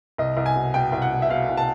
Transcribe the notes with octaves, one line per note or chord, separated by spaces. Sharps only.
C2 D#5
C2
G#5
B2
B2 G5
C2
F#5
B2
E5
B2 F5
C2
A5